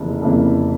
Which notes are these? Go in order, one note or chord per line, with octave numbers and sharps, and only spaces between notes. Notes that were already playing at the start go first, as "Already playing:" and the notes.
Already playing: F1 F2 C#3 E3 A#3
F1 F2 C#3 E3 A#3